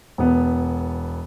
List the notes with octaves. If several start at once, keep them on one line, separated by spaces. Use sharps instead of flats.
E1 B3